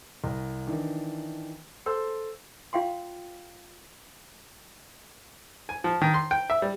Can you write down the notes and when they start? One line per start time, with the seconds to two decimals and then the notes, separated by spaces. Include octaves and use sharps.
0.24 C2
0.67 D#3 E3 D4
1.86 A4 C5 C6 E6 G6
2.73 F4 F5 G5 C6
5.69 G#5
5.84 F3
6.02 D#3
6.14 C6
6.31 G5
6.50 E5
6.62 G3